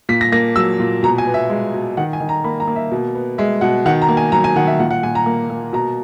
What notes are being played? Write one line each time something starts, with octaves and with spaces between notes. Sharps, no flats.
A#2 B6
A#6
A#3 A#6
F#3 E6
A#2
B2 A#5
G#5
B3
E5
G#3 E5
B2
D#3 F#5
G#5
D#3
A#5
A#3 B5
A#5
A#3
E5
B2
B3
G#3 E5
B2 F#5
D#3 F#5
A#5
A#3
G#5
F#3 A#5
G#5
D#3 F#5
E5
A#2 F#5
F#5
A#2 G#5
A#5
A#3
A#3
B2 A#5